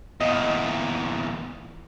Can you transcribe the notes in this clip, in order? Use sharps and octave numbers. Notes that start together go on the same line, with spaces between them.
E2 A#2 D#5